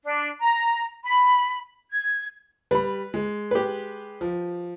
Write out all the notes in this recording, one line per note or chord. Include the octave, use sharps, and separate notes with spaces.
D4
A#5
B5
G#6
G3 B4 B5
G#3
G4 B4
F3